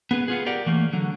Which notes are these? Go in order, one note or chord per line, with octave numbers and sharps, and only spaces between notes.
B3 G#4 B4
B3 F4 G#4
G4 A#4 D5 F#5
E3 A3 A#3
D3 F#3